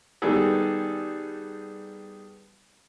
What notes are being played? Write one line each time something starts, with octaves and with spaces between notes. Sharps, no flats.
D#3 G3 B3 G#4 A4